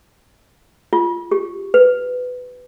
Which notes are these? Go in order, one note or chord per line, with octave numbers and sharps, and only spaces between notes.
F4
G4
B4